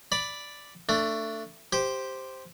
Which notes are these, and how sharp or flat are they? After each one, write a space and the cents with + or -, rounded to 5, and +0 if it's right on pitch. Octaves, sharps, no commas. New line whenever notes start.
D5 +0 B5 +0
A3 +20 D4 +0
G4 +0 C5 +0